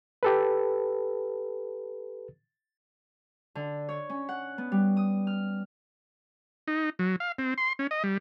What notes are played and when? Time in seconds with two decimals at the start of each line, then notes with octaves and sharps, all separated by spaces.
0.23 G4 A4 B4
3.55 D3
3.89 C#5
4.10 C#4
4.29 F#5
4.58 B3
4.72 G3
4.97 D#6
5.27 F6
6.68 D#4
6.99 F#3
7.20 F5
7.39 C4
7.58 C6
7.79 C#4
7.91 D#5
8.04 G3